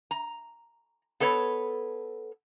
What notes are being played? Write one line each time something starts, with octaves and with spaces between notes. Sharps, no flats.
A#5
B3 A4 B4 C#5